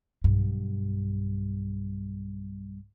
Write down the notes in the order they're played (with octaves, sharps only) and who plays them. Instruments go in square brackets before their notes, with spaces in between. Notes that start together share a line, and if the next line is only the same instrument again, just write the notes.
[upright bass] B1 G2